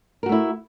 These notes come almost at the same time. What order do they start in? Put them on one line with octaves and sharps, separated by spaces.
A#4 F#4 A3 E4